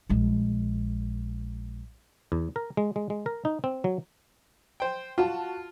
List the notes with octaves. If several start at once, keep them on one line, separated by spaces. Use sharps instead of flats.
A#1 G#3
E2
A#4
G#3
G#3
G#3
A#4
D#4
C4
F#3
C5 G5
F4 F#4 A5